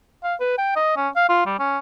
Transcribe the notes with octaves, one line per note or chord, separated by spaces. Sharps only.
F5
B4
G5
D#5
C#4
F5
F4
G3
C#4